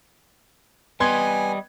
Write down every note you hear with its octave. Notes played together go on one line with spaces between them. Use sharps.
G3 B3 D#5 G#5 C6 G#6